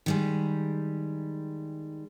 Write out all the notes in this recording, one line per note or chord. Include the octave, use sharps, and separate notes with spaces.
D#3 G3 G#3